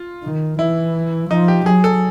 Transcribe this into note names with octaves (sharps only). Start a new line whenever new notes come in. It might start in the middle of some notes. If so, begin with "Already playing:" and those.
Already playing: F4
D#3
E3 E4
F3 D#4
G4
F#3 G#4
A4